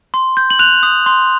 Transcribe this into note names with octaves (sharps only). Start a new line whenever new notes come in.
C6
G6
F#7
F#6 F7
D#6
C6